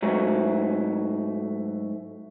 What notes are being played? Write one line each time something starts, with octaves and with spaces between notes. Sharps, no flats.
G#2 F#3 A3